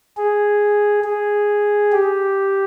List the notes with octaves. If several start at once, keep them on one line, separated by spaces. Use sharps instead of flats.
G#4
G#4
G4